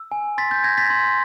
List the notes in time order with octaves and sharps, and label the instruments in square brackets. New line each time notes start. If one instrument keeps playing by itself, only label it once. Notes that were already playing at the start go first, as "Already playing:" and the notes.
Already playing: [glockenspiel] E6
G#5
C6 A6 B6
G6 A6
G6 G#6 A#6
A6 B6
C6